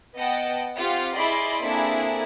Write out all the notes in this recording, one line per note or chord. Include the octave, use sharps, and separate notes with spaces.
B3 D#5 F#5 G5 A5
C4 F4 G4 F#5
E4 G#4 D5 D#5 B5 C6
A#3 C4 D4 E4 G#4 A4